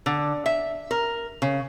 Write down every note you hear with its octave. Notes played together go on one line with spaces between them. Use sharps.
D3
E5
A#4
C#3